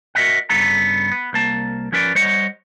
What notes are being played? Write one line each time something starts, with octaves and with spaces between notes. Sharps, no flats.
F#4 A#4 D#5 E5 F#5
G2 C#3 B3 A4 A#5
B3
C2 A#3 A5
F3 C#4 A#4 B4 D5
G3 C5 C#5 D#5 F#5